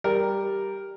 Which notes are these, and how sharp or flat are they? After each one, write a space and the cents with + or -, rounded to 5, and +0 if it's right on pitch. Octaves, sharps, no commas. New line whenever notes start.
G3 +0 A#4 +0 D5 +0